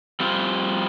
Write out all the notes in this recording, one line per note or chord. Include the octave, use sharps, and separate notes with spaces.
G3 C4 F4